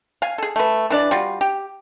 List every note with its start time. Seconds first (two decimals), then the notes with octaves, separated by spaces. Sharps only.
0.22 F5 G#5
0.38 G#4 A4
0.56 A3 B4
0.90 E3 D4 D5
1.11 G3 F4 F#4
1.41 G4